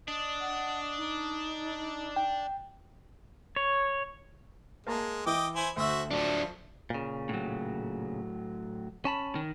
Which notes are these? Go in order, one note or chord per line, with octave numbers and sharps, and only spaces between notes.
D4 D#5
F#5
D#4
G5
C#5
G#3 A#3 A5 A#5
E3 D#5 G5 D6
E4 C5 G#5
D2 F#4 C5 E5 E6
F3 F#3 D4
A#2 C#3
A2 F#3
C#4 A5 B5
D#3